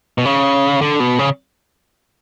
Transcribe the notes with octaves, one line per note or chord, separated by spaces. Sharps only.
B2
C#3
D3
B2
C#3